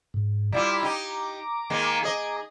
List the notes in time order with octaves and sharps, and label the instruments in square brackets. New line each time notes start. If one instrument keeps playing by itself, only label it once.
[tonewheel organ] G#2
[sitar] G3 E4 F4 [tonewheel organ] A#5 D6
[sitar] D#4 G4
D#3 G#3 A#3
G#4 D#5